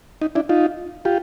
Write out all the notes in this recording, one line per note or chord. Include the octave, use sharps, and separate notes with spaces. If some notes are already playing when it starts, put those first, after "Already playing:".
D#4
D4 E4
D#4 F4
F4 G4